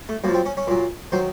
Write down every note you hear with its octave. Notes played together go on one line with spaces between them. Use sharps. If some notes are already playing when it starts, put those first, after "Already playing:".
A3
F#2 F3 A#3
C4
C#4
C#4
A#2 F#3
D#3 F#3 C5